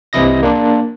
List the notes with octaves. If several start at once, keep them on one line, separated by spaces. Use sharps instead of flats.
C2 C3 E3 E4 D#5 A#6
A#3 D4